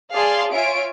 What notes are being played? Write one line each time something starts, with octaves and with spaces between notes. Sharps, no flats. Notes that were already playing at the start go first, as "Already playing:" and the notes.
G#4 D5 F5 A5 C6
F4 C#5 E5 G#5 D7